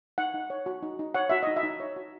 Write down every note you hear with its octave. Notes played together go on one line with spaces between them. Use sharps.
D#4 F#5
D#4
C#5
F#4
D#4
D#4
C#5 F#5
F#4 E5
D#4 D#5
E5
D#4
C#5
F#4